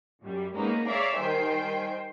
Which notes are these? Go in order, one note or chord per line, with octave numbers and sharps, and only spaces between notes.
F#2 G3
G#3 A#3 B3 C#4 D#4
G#4 C#5 D5 E5 F5 A#5
D#3 G3 C5 G5 G#5